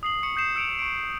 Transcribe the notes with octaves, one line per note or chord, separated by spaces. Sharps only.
D#6 C7 F#7
C#6 C#7
D#6 G6 C7 E7
E6 C#7 D7 F7
C#6 D7